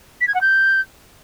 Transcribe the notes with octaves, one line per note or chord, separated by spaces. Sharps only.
B6
G#6
F#5
G6